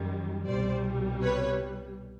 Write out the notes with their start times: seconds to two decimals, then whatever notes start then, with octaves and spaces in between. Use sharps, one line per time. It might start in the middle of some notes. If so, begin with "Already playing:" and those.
Already playing: F#2 D#3 G3
0.46 C2 B2 G3 C5 D5
1.22 B4 C#5